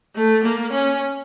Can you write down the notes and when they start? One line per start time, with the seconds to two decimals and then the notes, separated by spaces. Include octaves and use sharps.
0.15 A3
0.44 A#3
0.72 C#4